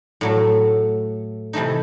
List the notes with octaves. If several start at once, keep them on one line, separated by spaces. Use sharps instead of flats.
A2 F#3 A3
C3 E3 A3 D#4